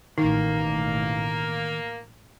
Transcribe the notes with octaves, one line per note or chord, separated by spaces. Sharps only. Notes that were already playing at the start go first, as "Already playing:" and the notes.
A1 B2 D#3 A#3 D#4